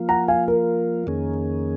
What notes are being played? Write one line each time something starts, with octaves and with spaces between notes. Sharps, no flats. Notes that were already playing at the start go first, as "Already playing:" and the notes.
Already playing: F3 A#3 F4
F#5 A#5
F5 G#5
A#4
F2 D#3 A#3 C#4 G#4